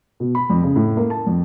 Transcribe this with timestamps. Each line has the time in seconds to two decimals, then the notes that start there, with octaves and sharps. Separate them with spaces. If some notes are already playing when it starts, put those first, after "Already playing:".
0.20 B2
0.35 B5
0.50 F2
0.63 C#3
0.76 A2
0.97 A#3
1.10 A5
1.27 F2